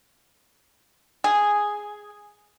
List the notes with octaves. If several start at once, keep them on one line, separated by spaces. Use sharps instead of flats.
G#4